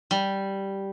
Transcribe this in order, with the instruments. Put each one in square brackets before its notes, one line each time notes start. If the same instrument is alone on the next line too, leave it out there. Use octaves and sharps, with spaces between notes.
[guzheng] G3